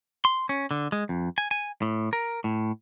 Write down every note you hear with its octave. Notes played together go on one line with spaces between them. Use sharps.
C6
C#4
D3
G#3
F2
G#5
G#5
A2
A#4
A2